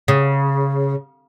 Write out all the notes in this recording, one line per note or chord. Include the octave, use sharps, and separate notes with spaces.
C#3